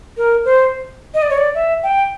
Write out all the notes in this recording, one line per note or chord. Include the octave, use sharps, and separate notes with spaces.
A#4
C5
D#5
D5
C#5
D5
E5
G5